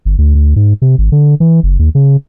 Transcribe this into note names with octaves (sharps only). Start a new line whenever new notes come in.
G1
D2
D2
G#2
C3
G#1
D3
E3
F#1
D#2
C#3